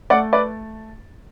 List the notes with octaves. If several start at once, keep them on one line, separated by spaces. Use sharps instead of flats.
A3 D5 F#5
B4 D5